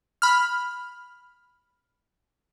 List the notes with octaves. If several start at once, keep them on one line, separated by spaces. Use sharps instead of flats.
B5 F6